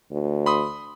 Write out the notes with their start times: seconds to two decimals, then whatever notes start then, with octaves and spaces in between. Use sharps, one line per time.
0.12 D2
0.46 B5 C6 D#6